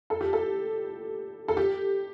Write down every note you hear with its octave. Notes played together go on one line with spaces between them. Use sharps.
A4
G4
A4
A4
G4